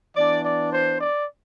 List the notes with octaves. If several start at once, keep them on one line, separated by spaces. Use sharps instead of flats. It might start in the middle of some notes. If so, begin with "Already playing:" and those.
E3 B3 D4 D5
D5
C5
D5